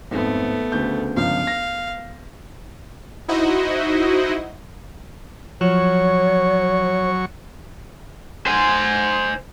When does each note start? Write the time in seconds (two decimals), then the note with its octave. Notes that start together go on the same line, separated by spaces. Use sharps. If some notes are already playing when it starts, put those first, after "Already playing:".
0.11 G#1 F2 A3 B3
0.72 D2 C#3 G6
1.16 G1 C#2 F3 F5
1.47 A#6
3.28 D#4 E4 F#4 C5 D#5
5.61 F3 F#3 C#5 C#6
8.46 C5 G#5